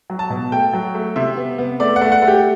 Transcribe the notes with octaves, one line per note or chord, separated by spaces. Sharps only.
F#3
A5
B2
A3 G5
F#3
A3
C3 E5
B3
B3
A3 D5
F#5
A3
F#5
A3
G4